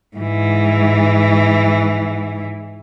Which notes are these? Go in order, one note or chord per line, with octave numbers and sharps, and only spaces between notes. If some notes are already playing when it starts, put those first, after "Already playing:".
G#2 E3